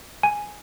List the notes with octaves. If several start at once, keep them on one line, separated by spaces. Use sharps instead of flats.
G#5